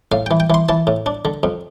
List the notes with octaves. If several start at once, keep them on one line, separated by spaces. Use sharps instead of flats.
A2 F5
E3 G5
G5
E3 C6
E3 A5
A2
D4
D3
F2